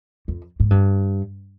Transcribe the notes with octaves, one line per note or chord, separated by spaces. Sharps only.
F2
G#2
G2